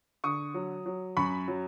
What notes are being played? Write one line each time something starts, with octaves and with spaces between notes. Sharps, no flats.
D3 C#6 D#6
F#3
F#3
F#2 B5 C#6
F#3